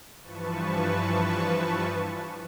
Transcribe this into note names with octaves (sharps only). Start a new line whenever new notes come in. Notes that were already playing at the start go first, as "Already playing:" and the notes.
G2 E3 F3 B4 A5 C#6